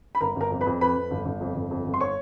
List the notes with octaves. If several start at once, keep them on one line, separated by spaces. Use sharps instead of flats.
B5
G1 A#4 A#5
G1 A#4 A#5
F2
B4 B5
F2
F2 B4 B5
F2
G1
G1
F2
G1
F2
G1
C6
C#5 C#6